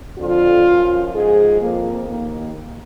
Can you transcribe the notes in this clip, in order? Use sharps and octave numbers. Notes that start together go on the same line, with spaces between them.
F2 D3 F3 F4
F#2 F3
G#2 F3 G#4
F2 F3 A#3
D#2 D#3 A#3